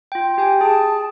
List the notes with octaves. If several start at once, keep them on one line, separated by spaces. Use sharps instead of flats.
F4 G5
G4 G5 G#5
G#4 A5